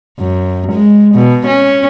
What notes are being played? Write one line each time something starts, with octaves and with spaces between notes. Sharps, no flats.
F#2
G#3
B2
C#4